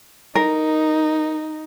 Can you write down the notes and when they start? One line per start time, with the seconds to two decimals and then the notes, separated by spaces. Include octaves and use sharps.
0.35 D#4 A#4